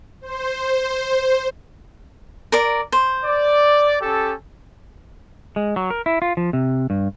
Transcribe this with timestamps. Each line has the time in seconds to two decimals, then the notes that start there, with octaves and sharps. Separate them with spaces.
0.21 C5
2.52 A#4 D5
2.92 C5
3.25 D5
4.01 C#4 G4 A4
5.56 G#3
5.76 F#3
5.90 A#4
6.06 E4
6.22 F4
6.37 F3
6.53 C3
6.90 G2